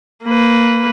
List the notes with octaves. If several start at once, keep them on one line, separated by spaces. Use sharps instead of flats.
A#3 B4